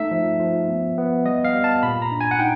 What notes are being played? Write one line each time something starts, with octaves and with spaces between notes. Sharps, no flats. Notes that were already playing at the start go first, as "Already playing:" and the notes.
Already playing: A3 D#4 E5
F3
F3
B3
B3
G3 D#5
F5
G3
A5
A#2 B5
A#5
D4
G#5
F#5
D#4 G5